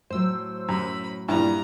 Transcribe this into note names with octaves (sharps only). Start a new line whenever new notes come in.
A2 F#3 C5 E6
F#2 B5
G2 A#2 G3 E4 A#5